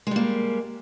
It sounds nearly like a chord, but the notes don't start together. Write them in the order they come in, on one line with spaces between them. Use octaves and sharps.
G#3 G3 A#3